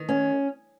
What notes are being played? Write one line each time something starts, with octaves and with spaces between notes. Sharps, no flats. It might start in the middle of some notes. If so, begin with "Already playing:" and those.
Already playing: D#3
C#4